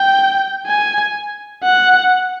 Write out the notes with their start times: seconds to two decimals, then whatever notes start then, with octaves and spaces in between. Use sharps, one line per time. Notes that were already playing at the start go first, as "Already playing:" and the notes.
Already playing: G5
0.66 G#5
1.63 F#5